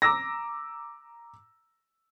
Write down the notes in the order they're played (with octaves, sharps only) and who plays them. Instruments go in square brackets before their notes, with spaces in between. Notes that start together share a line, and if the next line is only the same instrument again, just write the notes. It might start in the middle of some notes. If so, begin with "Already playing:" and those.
[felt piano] A#5 D6 E6 A#6